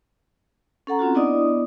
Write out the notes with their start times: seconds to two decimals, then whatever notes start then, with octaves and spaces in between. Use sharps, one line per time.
0.87 C#4 A4 F#5 A#5
0.99 C4 C#4 F4 F#4
1.15 B3 D4 E4 D5 D#5 D#6